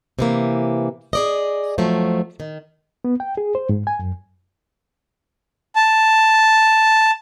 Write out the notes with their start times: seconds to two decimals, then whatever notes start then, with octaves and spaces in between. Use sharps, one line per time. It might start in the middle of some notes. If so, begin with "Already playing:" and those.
0.19 C3 E3 A#3
1.13 G#4 D5 D#5
1.78 F2 F3 F#3 A3
2.40 D#3
3.05 B3
3.20 G5
3.37 G#4
3.55 C5
3.69 G#2
3.87 G#5
3.99 F#2
5.76 A5